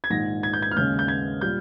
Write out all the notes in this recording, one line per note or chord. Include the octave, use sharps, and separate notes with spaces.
G#6
A#1 G#2 D#3 G#3 A#6
G#6
G6
G#6
F6
D#2 C#3 G#3 C#4 G6
G6
G#6
A#2 G3 G6